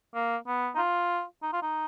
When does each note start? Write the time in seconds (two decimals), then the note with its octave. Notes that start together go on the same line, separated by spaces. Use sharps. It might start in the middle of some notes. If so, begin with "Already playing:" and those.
0.14 A#3
0.47 B3
0.75 D#4
0.78 F4
1.42 D#4
1.53 F4
1.62 D#4